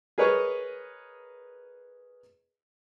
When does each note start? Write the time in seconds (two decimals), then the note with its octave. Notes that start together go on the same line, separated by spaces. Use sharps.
0.18 G#4 A#4 B4 C#5 D#5 C#6